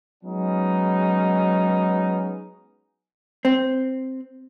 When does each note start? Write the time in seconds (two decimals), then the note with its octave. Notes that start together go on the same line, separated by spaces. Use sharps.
0.24 F#3 G#3 B3 C#4 D#4
3.45 C4